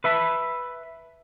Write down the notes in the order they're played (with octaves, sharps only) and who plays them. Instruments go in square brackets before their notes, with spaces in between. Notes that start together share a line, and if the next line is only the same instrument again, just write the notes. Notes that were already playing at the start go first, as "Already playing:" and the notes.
[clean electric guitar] B4 E5 A5 B5